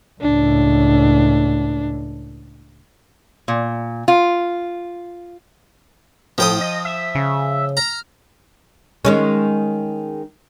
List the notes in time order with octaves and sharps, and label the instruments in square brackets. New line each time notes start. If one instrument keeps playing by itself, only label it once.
[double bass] C#2 A2 [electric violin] D4
[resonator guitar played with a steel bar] A#2
F4
[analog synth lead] A2 [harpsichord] F3 G5 D#6
[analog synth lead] D#5
E5
[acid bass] C#3
[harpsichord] A#5 [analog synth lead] F6
[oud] D#3 G#3 C#4